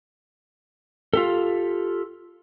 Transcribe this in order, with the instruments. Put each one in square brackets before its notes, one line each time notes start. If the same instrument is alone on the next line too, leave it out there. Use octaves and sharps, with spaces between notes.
[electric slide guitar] F4 G4 A4